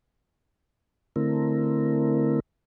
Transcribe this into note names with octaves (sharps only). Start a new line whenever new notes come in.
D3 A3 C4 E4 A#4